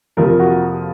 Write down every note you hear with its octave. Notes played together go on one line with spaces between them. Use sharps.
F2 C3 F3 A#3 A#4
F#4